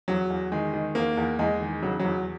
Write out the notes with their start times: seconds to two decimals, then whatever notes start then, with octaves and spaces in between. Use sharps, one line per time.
0.08 E2 F#3
0.30 E2
0.52 D#3 G#3
0.74 D#3
0.95 E2 A#3
1.17 E2
1.39 E2 G#3
1.61 D#3
1.82 C#3 F#3
1.99 E2 F#3